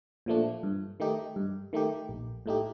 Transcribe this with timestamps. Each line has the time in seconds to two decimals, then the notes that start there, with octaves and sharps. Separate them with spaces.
0.26 A#2 F3 A3 D4
0.63 G2
1.00 D#3 A3 D#4 G4
1.36 G2
1.73 D#3 A3 D#4 G4
2.09 A#1
2.46 A2 A3 D#4 G4